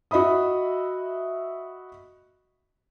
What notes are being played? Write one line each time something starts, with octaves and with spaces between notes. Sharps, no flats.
F#4 D#5 E5 B5 D#6